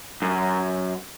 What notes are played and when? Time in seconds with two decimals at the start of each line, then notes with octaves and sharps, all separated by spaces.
0.22 F#2